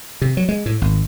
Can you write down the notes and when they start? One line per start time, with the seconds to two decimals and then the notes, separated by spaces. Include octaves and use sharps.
0.22 C3
0.37 F#3
0.49 G#3
0.66 A2
0.81 G#1